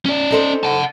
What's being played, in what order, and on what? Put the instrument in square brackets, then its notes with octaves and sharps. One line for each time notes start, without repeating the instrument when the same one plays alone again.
[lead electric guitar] C#4 D5
[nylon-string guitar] D#4 A4 C5
[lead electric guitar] F#5 A5